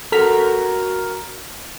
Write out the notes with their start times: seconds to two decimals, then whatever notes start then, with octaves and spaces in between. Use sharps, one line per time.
0.12 F#4 A4 A#4 F6 B6